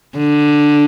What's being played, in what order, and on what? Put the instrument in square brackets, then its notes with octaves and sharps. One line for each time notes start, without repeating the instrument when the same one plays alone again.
[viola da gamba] D3